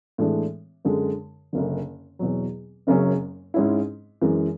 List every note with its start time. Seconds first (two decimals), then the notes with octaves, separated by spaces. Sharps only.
0.18 A2 E3 G#3 D4
0.85 F#2 D3 G#3
1.53 F#1 F#2 D3
2.19 E2 B2 F#3
2.87 F#1 F#2 C#3 F#3 C#4
3.54 G#2 G#3 C#4 E4
4.22 F#2 E3 G#3